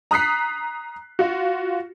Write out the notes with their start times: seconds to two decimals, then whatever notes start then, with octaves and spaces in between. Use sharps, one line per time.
0.11 A#5 D#6 F#6 B6 C7
1.19 F4 F#4